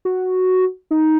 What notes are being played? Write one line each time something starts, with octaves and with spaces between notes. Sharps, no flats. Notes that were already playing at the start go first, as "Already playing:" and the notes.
F#4
D#4